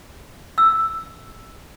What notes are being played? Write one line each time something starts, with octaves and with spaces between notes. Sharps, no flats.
E6